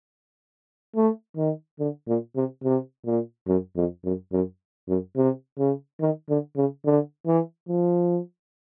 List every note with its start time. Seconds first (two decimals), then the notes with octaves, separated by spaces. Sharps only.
0.96 A3
1.37 D#3
1.80 D3
2.08 A#2
2.36 C3
2.64 C3
3.06 A#2
3.48 F#2
3.76 F2
4.04 F#2
4.33 F#2
4.88 F#2
5.16 C3
5.58 C#3
6.01 D#3
6.29 D3
6.57 C#3
6.85 D3
7.26 E3
7.69 F3